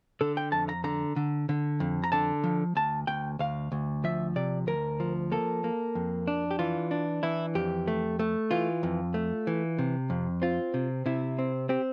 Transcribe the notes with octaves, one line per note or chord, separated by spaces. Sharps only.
D3 A4
G5
F2 A5
A#5
D3 A#5
D3
D3
F2
A#5
D3 A5
F3
D2 A5
D2 G5
D2 F5
D2
F3 E5
C3 D5
D2 A#4
F3
A#3 A4
A#3
F2
D4
G4
E3 F4
D4
E3 E4
F2 G4
A3
A3
E3 F4
F2
A3
E3
C3
F2
C4 F4
C3
C3 E4
C4
C4 G4